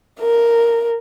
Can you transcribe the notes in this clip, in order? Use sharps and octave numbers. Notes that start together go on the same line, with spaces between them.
A#4